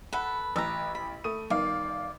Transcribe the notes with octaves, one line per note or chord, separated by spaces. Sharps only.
A4 B4 F#5 B5
A1 B4 A#5 E6
B5
A3 D#6 D#7
G1 D#3 D5 F5